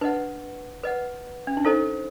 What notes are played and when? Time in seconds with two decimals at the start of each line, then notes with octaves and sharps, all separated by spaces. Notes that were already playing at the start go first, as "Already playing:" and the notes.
0.01 D4 B4 D#5 F#5
0.83 B4 D#5 F#5
1.47 C#4
1.57 D4
1.65 D#4 A4 C5 D#5